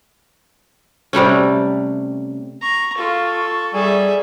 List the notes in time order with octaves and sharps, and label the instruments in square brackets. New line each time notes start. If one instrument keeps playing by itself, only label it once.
[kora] C3 G3 A3 C#4
[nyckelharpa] A#5 [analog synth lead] C#6
[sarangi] F4 [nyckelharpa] A4
[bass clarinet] G3 [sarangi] G#4 [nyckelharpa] A4 E5